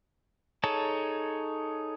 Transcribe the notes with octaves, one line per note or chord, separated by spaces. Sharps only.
D#4 G#4 A4 C#5 A5